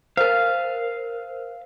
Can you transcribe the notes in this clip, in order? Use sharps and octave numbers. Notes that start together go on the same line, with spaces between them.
A#4 C5 F5